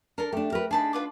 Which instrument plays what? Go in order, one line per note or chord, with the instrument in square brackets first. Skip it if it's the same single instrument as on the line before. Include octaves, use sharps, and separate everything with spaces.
[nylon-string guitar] D4 [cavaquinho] A4 A#4
[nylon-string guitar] A3 D4 [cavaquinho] G4
[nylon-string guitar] A#4 B4
[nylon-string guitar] D4 D#4 [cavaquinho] G#4 A5 B5
[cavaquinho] F4 B4 D6